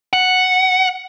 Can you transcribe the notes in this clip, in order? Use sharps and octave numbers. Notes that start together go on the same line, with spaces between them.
F#5